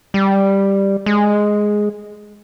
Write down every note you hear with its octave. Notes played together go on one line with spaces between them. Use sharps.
G3
G#3